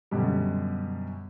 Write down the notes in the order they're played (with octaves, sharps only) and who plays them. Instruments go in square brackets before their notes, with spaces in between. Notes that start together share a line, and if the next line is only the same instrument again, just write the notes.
[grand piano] F#2 B2 D3 G3